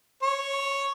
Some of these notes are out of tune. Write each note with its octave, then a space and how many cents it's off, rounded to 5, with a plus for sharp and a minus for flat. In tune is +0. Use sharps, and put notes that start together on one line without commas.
C#5 -5